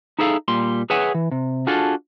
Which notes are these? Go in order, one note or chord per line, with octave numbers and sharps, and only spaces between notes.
D#4 E4 G#4 A4 D5 F5
A#2 G3 C6
G#4 B4 C#5 E5 F#5 G#5
E3
C3
D4 F4 F#4 G#4 A4